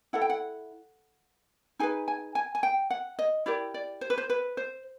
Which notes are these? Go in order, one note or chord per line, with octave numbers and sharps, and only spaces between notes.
E4 A4 F#5
G5
F#5
D#4 G#4 B4 G#5
G#5
G#5
G#5
G5
F#5
D#5
E4 G4 A#4 D5
D5
C5
B4
C5
B4
C5